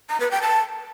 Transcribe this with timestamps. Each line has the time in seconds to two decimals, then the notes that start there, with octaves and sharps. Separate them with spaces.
0.10 A#5
0.20 B4
0.31 G5
0.42 A5